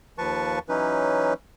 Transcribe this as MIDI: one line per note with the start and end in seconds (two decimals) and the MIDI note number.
0.18 0.59 39
0.18 0.59 53
0.18 0.59 71
0.18 0.59 81
0.18 0.59 85
0.69 1.34 52
0.69 1.34 54
0.69 1.34 61
0.69 1.34 63
0.69 1.34 71